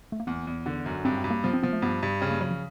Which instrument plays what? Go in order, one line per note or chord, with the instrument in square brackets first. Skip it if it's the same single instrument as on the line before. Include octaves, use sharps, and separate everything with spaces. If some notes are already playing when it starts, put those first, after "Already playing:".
[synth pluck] A3
A#3
[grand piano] E2 [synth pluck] B3
[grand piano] E2
[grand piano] D3 [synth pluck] B3
[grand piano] F#2
[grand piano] G2 [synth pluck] C4
[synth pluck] C4
[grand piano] G2
[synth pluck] A#3
[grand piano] F3 [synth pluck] B3
[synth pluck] C4
[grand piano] F3 [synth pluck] B3
[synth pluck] A3
[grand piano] G2 [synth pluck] B3
[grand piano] G2
[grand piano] C#3 [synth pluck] C4
[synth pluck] A#3
[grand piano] C#3 [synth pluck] F#3
[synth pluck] F3